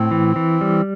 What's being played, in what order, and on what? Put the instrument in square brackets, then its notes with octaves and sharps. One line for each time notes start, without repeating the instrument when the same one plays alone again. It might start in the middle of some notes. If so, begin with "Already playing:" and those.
Already playing: [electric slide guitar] A2 [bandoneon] C4
[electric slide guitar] E3
E3
G3